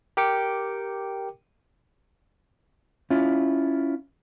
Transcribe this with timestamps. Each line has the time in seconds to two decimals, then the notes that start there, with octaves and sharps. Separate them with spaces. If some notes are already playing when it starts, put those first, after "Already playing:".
0.17 G4 A#4 G5 D6 C#7
3.10 C#4 E4 F4